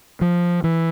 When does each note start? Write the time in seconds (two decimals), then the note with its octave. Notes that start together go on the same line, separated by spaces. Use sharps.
0.21 F3
0.64 E3